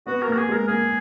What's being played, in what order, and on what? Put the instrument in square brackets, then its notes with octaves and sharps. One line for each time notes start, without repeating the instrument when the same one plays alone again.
[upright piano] B3 [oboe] F#4
[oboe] A#4
[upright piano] A#3
[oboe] F#4
G#4
[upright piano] G#3 [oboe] A#4
[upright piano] A#3 [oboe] G#4